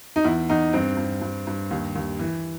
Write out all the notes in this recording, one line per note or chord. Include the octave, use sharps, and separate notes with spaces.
D#4
E2 E4
E2 D#4
G2 C4
G2
G2
G2
D#2
D#2
E3